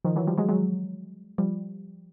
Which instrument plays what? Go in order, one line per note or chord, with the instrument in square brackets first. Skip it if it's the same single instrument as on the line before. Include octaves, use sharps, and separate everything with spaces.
[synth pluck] D#3 F3
E3 F#3
F3 G3
F#3 G#3
F#3 G#3
F3 G3